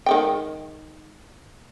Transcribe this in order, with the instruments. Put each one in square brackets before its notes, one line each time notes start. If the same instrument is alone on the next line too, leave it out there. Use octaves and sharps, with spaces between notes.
[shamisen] D#3 G#3 G5